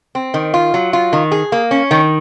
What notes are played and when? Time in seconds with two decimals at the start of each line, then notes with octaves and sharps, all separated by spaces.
0.15 C4
0.34 D#3
0.54 F4
0.74 F#3
0.93 F4
1.13 D#3
1.32 G#4
1.52 A#3
1.71 C#4
1.91 D#3